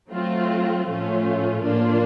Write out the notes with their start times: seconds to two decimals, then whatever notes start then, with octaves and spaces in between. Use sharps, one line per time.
0.09 F#3 A3 C4 F4
0.87 A2 F3 A3 C#4 F4
1.63 A2 F3 A#3 D4 F4